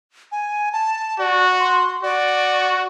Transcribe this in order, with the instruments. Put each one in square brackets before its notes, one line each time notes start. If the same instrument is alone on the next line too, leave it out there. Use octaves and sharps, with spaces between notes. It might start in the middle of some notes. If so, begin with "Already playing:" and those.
[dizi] G#5
A5
[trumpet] F#4 [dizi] D5
[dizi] C6
[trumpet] F#4 [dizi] D5